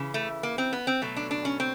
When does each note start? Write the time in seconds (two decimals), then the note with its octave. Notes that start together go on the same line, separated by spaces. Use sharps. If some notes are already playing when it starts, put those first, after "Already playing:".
Already playing: C#3 E3
0.14 A3
0.43 A#3
0.58 C4
0.73 B3
0.87 C4
1.02 B2 F#3 A3
1.16 D4
1.31 D4
1.45 C#4
1.60 C4